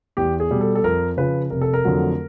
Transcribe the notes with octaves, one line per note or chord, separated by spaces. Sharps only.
E2 G4
G#4
B2 G3
A4
A4
F2 A#4
C#3 F3 B4
F1 A#4
A4
A#4
F2 D3 F#3 A3